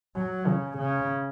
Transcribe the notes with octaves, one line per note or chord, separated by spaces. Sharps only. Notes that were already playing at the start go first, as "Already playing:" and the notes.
F#3
C#3
C#3